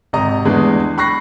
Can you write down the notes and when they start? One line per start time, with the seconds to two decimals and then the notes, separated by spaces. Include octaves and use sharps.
0.13 G#1 C3 D#5 A#5
0.45 E2 G#3 A3 B3 D4
0.98 B5 C#6 F#6 A#6 C7